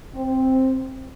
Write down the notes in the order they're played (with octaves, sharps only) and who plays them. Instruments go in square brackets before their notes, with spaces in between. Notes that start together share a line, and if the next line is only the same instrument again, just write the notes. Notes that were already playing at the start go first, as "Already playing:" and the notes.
[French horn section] C4